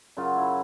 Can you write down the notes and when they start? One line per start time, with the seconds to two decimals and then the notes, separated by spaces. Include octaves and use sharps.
0.17 F#2 C#3 F#3 F4
0.36 E4